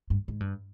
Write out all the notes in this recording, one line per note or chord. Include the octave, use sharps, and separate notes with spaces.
G2
G#2
G2